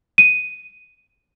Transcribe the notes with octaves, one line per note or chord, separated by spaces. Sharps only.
D#7